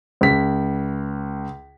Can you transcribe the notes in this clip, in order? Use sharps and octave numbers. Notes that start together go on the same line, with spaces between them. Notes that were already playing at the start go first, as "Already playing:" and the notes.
C#2 B6